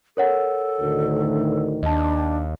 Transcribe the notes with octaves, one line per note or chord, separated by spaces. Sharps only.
A4 A#4 C#5 F#5
D2 A2 D#3
D#2 D4 D#5 A5